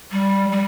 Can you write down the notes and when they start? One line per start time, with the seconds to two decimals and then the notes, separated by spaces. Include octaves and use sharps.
0.12 G3
0.52 G3